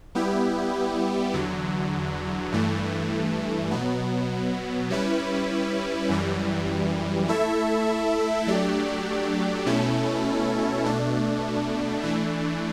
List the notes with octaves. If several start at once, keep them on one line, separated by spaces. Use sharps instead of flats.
G3 B3 E4 G4
E2 D3 F#3
G2 E3 A3
B2 F#3 B3
G3 C#4 E4 B4
F#2 E3 G3
A3 E4 A4 E5
F#3 A3 D4 G4 D5
B2 A3 C#4 E4 A4
B2 A3 D4
E3 A3 D4